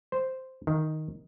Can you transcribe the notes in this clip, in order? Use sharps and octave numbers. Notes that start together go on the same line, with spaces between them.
C5
D#3